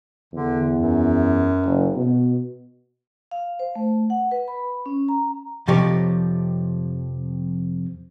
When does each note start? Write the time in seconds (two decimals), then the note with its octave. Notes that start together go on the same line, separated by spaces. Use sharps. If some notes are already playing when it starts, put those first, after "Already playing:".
0.33 E2 D3
0.76 F#2
1.66 F#1
1.96 B2
3.31 F5
3.59 C5
3.75 A3
4.10 F#5
4.31 B4
4.48 B5
4.86 C#4
5.09 A#5
5.68 F2 C3 F3 D#4 G4 C#5